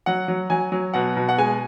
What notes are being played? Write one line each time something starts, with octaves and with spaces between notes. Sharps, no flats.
F#3 F#5
F#3
F#3 G#5
F#3
B2 F#5
B2
F#5
G#3 G#5